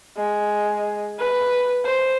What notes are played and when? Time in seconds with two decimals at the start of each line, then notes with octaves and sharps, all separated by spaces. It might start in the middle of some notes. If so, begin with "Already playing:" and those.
0.17 G#3
1.19 B4
1.85 C5